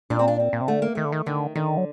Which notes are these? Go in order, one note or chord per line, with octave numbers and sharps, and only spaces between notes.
A#2 D4
C4
D4
C4
A#2
C3
D3 A3
A#3
D#3 A3
D3
D#3
D3 D#3
D3 D#3
F#3